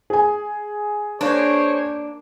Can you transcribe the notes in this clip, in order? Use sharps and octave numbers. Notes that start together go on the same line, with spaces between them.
G#4 G#5
A#3 D4 C5 C#5